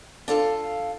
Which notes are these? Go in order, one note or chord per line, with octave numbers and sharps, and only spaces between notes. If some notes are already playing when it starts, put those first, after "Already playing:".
D4 F4 A4 F5